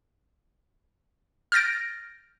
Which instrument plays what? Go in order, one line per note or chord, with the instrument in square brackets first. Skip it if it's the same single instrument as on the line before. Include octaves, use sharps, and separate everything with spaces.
[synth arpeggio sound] F6 G6 A6 A#6 D7